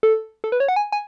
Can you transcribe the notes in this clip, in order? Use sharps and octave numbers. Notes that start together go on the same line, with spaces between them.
A4
A4
B4
C#5
F#5
G#5
G#5